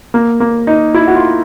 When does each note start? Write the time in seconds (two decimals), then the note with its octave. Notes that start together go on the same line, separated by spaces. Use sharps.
0.14 A#3
0.40 A#3
0.67 D#4
0.95 E4
1.07 F#4
1.15 F4